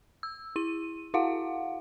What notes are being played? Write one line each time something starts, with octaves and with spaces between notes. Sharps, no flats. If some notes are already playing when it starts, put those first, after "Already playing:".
E6
E4 D#7
E4 F#4 F5 F#5